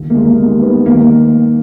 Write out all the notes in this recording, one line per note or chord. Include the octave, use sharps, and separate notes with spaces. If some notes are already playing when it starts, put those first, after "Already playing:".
Already playing: G1 D#2
A#3
D#2 G#3
G3
D#3 A#3
D#3 B3
D#2 A#3